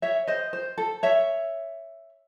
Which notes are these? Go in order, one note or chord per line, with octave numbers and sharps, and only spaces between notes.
C#5 E5
C5 D#5
C5
A4
C#5 E5